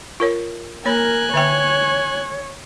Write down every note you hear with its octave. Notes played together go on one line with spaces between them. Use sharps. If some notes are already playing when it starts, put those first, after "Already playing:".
F4 A#4 C#5
A#3 A#4 C#5 G#5 B5 F#6
D3 C#5 E5 G5